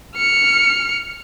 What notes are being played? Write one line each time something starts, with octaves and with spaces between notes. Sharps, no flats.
F6 C#7